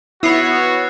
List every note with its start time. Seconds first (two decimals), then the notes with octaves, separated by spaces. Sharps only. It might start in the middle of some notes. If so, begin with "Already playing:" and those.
0.23 B3 E4 F#4 C#5 E6 C7